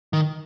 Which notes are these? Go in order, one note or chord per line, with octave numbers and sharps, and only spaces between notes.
D#3